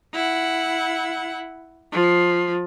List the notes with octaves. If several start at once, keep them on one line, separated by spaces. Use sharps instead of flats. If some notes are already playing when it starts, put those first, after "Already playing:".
E4 F#5
F3